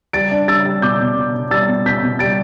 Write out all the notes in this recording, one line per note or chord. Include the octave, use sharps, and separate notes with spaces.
G3 A6 D7
D4
G3 E6 A6
G3
B2 D6 G6
B2
B2
B2
G3 E6 A6
B2
B2 G6 B6
B2
G3 A6 D7